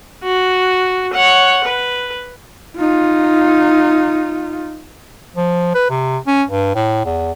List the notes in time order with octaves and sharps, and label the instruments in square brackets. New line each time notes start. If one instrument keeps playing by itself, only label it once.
[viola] F#4
C#5 F#5
B4
[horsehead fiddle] D#4 F4
[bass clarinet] F3
B4
C3
C#4
G2
A2
E2